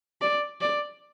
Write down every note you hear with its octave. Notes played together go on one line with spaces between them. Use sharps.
D5
D5